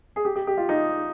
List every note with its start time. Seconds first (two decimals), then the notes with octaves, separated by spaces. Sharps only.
0.16 G#4
0.25 G4
0.36 G4
0.47 G4
0.58 F4
0.69 D#4